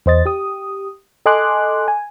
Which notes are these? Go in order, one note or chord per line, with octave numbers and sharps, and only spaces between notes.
E2 C5 D#5 A6
G4 D#6
A4 D#5 G#5 C6 D6 F#6
G#5